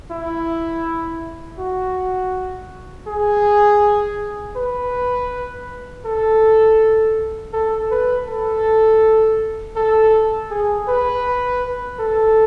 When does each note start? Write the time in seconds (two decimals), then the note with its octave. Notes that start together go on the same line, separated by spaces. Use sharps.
0.11 E4
1.59 F#4
3.07 G#4
4.56 B4
6.05 A4
7.53 A4
7.91 B4
8.28 A4
9.76 A4
10.50 G#4
10.88 B4
12.00 A4